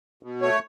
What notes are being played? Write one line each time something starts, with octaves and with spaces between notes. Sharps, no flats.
B2
A3 C#5